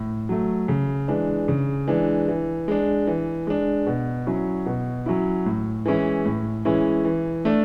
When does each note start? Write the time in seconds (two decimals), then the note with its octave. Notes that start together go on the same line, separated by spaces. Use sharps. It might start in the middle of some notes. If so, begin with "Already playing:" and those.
Already playing: A2
0.29 F#3 A3
0.68 C#3
1.08 E3 G#3 D4
1.48 C#3
1.88 E3 G#3 D4
2.28 E3
2.68 G#3 D4
3.07 E3
3.47 G#3 D4
3.87 B2
4.27 F#3 C#4 E4
4.66 B2
5.06 F#3 C#4 E4
5.46 A2
5.86 E3 G#3 C#4 E4
6.25 A2
6.65 E3 G#3 C#4 E4
7.05 E3
7.45 A3 D4